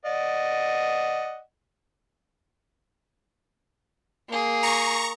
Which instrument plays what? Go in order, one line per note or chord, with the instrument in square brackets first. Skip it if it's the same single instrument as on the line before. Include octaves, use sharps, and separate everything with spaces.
[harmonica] D5 D#5 F#5
[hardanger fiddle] A#3 G#4
[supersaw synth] A#5 C#6